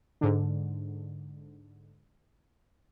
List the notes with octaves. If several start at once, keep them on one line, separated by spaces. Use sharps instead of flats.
G#2 D3